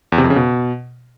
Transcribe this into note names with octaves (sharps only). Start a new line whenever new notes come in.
E2
C3
F2
C#3
B2